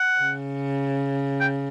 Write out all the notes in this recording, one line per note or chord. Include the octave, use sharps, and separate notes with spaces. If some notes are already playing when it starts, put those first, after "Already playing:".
Already playing: F#5
C#3
G5